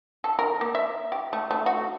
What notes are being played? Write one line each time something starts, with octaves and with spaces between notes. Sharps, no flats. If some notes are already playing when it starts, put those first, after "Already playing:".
A4
A#4
A#3
E5
G4
A3
A3
F#4